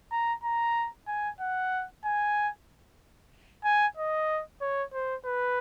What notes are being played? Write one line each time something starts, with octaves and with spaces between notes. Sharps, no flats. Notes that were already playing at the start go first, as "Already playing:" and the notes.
A#5
A#5
G#5
F#5
G#5
G#5
D#5
C#5
C5
B4